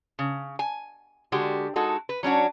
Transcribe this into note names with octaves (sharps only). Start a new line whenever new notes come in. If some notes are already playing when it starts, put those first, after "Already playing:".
C#3
G#5
D3 G#3 F#4 G4
G#3 D#4 F#4 A4
B4
F#3 C#4 D4 F#4